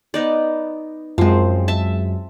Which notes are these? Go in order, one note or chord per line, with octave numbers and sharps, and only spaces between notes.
B3 D#4 D5
F#2 F3 G#3 C4
E5 A5